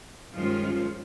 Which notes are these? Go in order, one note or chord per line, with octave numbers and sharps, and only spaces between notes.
G2 D#3 F3 G#3 C#4 F4